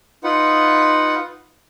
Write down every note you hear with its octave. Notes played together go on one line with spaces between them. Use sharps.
D#4 F4 B4 F#5